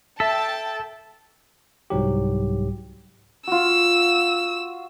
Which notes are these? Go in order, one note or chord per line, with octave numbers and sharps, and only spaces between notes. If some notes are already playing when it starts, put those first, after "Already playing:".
A4 E5 G5 A5 B6
C2 G#2 F#3 G4
F4 F#4 E6